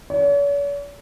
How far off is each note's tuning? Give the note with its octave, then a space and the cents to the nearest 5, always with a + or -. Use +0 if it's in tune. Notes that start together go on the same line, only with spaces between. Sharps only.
C#5 +45